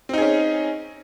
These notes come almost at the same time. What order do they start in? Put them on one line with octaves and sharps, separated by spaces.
C4 D#4 G#4 C#4